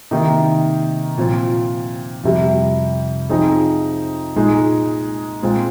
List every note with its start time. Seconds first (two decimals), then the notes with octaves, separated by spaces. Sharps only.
0.11 C3 D#3 A#3 D#4
1.18 A#2 F3 C4 F4
2.24 F2 C3 G3
3.29 F3 C4 D#4 G#4
4.36 A#2 G#3 D#4 G#4
5.42 A#2 G#3 C4 F4